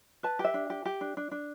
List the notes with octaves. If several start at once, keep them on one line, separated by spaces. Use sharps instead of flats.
B4 A5
G4
E5
D4
G4
G4
D4
D4
D4